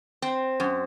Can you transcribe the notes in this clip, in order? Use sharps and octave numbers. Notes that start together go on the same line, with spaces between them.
C4
F#2